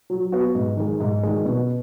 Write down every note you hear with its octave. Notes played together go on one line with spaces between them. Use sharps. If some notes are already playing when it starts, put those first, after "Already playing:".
F#3
B3 F#4
G#2
D#3 G#3
G#2
D#3 G#3
B2